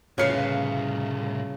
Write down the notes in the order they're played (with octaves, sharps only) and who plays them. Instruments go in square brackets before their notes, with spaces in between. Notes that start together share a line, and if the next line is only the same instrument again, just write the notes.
[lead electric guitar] C2 A2 [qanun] C#3 B4 F5 [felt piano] C#5 F6 C#7